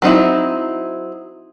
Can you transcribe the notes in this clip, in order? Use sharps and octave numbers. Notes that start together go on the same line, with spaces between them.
F#3 C4 D#4 E4